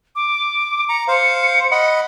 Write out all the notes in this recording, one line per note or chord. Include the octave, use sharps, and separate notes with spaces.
D6
A#5 C#7
C5 F5
D#5 F#5 B5